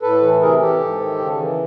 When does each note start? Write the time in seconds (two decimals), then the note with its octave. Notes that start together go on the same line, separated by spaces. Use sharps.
0.02 A2 A4 B4
0.21 E3
0.41 C3 G#4 A#4
0.60 E3 G4 A4
0.80 G#2
0.99 D#3
1.18 C#3
1.39 E3